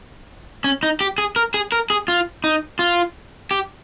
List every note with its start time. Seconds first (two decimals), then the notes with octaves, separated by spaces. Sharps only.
0.64 C#4
0.83 D#4
1.01 G4
1.18 G#4
1.36 A#4
1.54 G#4
1.72 A#4
1.90 G#4
2.08 F4
2.44 D#4
2.79 F4
3.51 G4